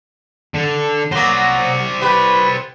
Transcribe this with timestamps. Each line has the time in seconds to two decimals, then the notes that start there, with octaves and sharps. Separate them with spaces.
0.54 D3
1.12 F#3 A#3 C5 D5
2.02 G4 B4